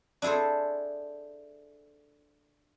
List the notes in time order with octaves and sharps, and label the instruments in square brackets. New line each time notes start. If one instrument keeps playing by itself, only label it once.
[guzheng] D4 E4 G#4 A4 C5